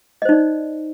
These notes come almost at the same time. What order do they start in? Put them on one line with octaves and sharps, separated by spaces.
D#5 C5 D#4 D5